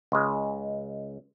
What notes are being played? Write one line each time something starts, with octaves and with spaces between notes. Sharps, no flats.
C#2 G#3